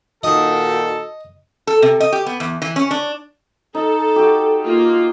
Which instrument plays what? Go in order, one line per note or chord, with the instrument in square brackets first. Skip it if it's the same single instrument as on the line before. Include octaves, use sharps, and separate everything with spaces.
[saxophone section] A#2 D#3 [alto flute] F#4 [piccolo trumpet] A4 [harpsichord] D#5
[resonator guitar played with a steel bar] A4
C3
D#5
G4
B3
E2
E3
C#4
D4
[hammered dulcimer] D#4 [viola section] A4
[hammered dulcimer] F#4 G4
[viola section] A#3 F4